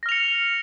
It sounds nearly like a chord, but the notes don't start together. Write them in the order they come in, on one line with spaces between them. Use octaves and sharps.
A#6 F6 F7 C#7